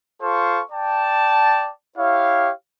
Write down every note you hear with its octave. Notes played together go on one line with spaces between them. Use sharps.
F4 A4 C5 F5 C#6
D5 G5 A5
E4 G4 C#5 F5